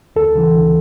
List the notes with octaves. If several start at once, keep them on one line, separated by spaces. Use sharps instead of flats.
D2 A4
C#3 E3
D2